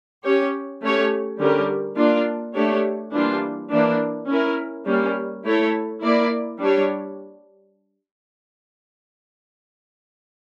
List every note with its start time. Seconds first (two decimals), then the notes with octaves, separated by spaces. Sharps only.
0.23 C#4 G4 C#5
0.81 A3 C#4 G4 C#5
1.39 D3 G3 C#4 G4 A#4
1.97 A#3 D4 F4
2.54 A3 D4 G4 C#5
3.13 E3 G3 A#3 D4 F4
3.71 E3 A#3 D4
4.28 C#4 E4 A#4
4.86 G3 A#3 C#4
5.44 A3 E4 A4 C#5
6.02 A#3 E4 A#4 D5
6.60 G3 D4 G4 C#5